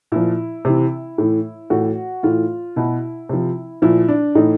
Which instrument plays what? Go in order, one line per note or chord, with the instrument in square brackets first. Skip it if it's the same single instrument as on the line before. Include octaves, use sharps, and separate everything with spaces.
[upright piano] A#2 F3 E4
C3 E3
A2 E3
A2 E3 F#4
A2 E3 F4
B2 E4
C3 F3
A#2 F3 E4
D4
A2 E3 D#4